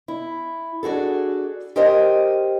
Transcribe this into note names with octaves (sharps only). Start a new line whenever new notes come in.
E4
D4 F#4 G#4 A4
G4 A#4 C5 D#5 G5 A5